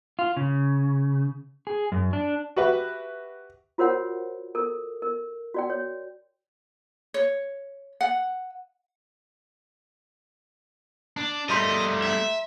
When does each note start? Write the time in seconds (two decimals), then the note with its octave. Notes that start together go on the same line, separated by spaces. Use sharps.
0.19 F4
0.37 C#3
1.67 G#4
1.92 F#2
2.13 D4
2.56 F#4 G4 B4 E5
3.78 F4 F#4 A#4 C5 C#5 F#5
4.55 A4 A#4
5.02 A#4
5.54 F#4 D5 G5
5.70 C#5
7.14 C#5
8.01 F#5
11.17 D4
11.50 G3 A3 D#5 A#5 C6 B6
12.02 E5